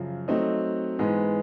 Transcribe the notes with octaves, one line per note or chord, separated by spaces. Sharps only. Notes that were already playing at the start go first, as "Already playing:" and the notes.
Already playing: F#2 C#3 F3
F#3 A3 C4 D#4
G#2 E3 G#3 B3